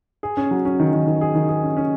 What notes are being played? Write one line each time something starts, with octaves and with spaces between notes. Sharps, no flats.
G#4
C#4
F#3
C#4
D#3
D#3
D#3
G#4
D#3
G#4
C#4
C#4